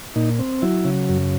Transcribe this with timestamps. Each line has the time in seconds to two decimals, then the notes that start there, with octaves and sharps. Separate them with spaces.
0.16 A#2 D#4
0.39 C4
0.62 F#3 E4
0.85 C#3
1.09 F#2